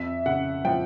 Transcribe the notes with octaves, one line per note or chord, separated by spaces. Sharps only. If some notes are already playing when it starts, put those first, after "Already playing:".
Already playing: F2 E5
C#3 F#5
F3 G5